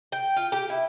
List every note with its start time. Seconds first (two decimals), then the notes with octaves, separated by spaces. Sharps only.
0.12 G5
0.36 F4
0.52 G4
0.70 E4